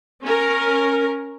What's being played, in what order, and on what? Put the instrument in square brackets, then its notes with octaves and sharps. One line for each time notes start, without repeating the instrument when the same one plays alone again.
[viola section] C#4 A#4